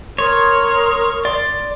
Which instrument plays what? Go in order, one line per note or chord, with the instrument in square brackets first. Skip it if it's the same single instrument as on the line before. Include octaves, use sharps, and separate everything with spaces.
[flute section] A#4 C6 D#6 [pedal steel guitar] C#5
[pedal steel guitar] D5 C6